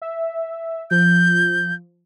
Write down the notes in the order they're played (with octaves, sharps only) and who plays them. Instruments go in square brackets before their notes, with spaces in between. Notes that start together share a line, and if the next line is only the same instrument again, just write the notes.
[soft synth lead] E5
[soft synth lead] F3 [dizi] G6